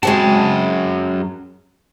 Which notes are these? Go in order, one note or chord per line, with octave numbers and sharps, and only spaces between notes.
F#2 G#3 C4 F#4 A5